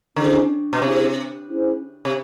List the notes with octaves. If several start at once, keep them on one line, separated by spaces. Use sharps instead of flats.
D3 C#4 E4 G#4 C5
B2
C3 C#4 E4 G#4 C5
C#4 E4 G#4 C5
C3